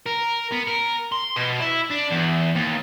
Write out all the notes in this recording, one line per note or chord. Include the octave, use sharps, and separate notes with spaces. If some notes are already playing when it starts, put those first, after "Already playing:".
A#4
B3
A#4
C6
B2
E4
D4
E2
D#2